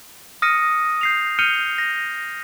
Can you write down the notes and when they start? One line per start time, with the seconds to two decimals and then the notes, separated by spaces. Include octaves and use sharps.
0.42 D#6 F6 A#6 C#7 D#7
1.01 G6 C7 F7
1.39 F6 G6 C#7 D#7 F7 G7
1.78 A#6